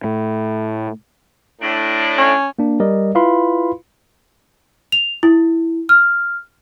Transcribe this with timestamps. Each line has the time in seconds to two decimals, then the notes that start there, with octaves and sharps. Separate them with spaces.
0.04 A2
1.62 A2 D4
2.18 C#4
2.59 A#3 D4
2.80 G3 A#4 D5 D#5
3.15 E4 F4 B4 F5 B5 C6
4.92 F7
5.23 E4
5.89 F6